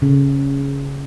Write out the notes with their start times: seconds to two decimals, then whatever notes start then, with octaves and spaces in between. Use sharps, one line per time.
0.02 C#3